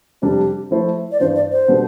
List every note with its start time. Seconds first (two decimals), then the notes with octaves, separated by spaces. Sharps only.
0.22 F2 C3 G3 D4 G4
0.71 F3 A3 E4 A4 C5
1.12 D5
1.20 G2 E3 B3 C5
1.36 D5
1.52 C5
1.68 B2 G3 B3 D4 A4